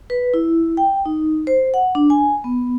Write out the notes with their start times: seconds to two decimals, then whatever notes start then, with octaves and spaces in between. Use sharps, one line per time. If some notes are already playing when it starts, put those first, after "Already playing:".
0.10 B4
0.34 E4
0.77 G5
1.06 D#4
1.47 C5
1.74 F#5
1.95 D4
2.10 G#5
2.44 B3